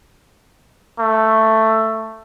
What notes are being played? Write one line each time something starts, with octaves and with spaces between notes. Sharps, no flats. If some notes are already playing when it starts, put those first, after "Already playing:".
A3